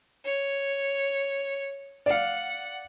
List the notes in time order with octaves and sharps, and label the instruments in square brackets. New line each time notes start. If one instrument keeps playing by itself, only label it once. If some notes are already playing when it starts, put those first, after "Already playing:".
[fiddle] C#5
[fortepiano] D5 F5 [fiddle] F#5